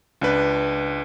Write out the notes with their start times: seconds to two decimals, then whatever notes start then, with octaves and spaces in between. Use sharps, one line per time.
0.21 C#2 D4 B4